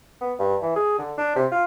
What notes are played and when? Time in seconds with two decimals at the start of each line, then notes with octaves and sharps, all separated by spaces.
0.21 B3
0.39 G2
0.62 E3
0.76 G#4
0.99 D3
1.18 D4
1.36 C3
1.51 F4